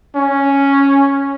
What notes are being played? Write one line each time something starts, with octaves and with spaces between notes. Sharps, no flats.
C#4